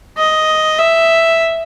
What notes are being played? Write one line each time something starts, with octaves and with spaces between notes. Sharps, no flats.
D#5
E5